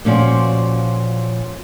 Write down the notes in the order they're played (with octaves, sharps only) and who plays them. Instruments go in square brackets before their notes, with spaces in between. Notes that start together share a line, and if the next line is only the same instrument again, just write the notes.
[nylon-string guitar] A#2 F3 C#4 F#4 D5